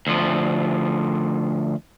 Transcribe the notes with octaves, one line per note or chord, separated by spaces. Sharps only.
D2 F3